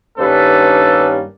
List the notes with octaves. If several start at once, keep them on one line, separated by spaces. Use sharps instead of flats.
G2 D#3 G3 A#3 C#4 A4 B4